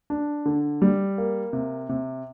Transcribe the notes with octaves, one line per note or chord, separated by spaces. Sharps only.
D4
D3
G3
A#3
C3
C3